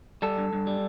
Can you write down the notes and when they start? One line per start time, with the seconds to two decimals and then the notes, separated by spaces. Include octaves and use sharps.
0.22 G3 A4
0.38 G2
0.53 G2
0.67 G3